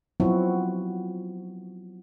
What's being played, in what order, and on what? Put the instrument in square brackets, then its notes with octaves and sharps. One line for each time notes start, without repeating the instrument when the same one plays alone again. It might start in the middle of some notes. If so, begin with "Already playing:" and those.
[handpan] F3 F#3 B3 C4 E4 F#4